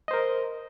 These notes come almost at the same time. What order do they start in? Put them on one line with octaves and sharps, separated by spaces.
D#5 C5 A#4